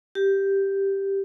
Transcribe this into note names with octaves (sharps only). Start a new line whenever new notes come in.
G4